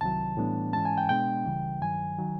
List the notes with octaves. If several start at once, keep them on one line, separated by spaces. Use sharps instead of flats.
C2 C3 D#3 F#3 A5
A2 E3 G3 B3 D4
G#2 E3 G#3 C#4 A5
G#5
G5
B2 G#3 B3 D4 G5
C#2 C#3 E3 G3
G2 D#3 F#3 G#5
D#3 F#3